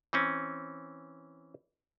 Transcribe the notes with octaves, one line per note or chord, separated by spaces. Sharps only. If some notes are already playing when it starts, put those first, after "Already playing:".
E3 C4 C#4